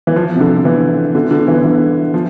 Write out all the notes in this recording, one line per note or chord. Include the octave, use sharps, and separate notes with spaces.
E3
F3
C3
D3
E3
D3
D3
E3
E3
F3